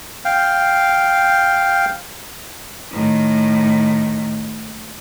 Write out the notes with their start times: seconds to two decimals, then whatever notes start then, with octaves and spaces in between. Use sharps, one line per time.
0.25 F5 G5
2.91 A2 D#3